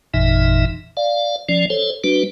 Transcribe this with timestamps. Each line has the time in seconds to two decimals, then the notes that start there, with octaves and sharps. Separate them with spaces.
0.14 G#1 F2 A#2 E3 D#4 E5
0.97 D5 F5
1.49 F3 C#4 D5
1.70 A4 C5 C#5
2.04 G3 D4 F#4 B4